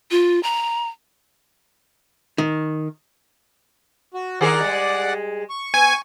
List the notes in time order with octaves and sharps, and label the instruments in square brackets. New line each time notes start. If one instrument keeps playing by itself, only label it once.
[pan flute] F4
A#5
[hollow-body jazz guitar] D#3
[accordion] F#4
[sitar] D#3 G#4 A#4 [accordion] D5 F#5
[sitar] G3 G#3
[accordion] C#6
[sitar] B3 [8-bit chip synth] G#5